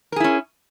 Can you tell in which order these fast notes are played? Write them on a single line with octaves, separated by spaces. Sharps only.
A#4 G#4 E4 C#4